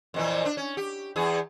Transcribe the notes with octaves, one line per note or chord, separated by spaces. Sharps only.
F2 A#2 E3
D4
C#4
G4
E2 G#4